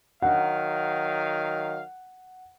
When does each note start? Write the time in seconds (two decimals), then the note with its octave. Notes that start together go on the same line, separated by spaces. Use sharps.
0.22 D#3 F#3 F5 F#5